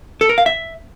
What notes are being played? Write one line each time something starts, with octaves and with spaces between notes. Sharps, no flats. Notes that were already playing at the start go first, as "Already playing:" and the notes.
A4
A#4
F5
E5